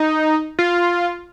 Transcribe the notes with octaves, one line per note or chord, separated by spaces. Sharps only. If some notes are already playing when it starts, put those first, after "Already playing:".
Already playing: D#4
F4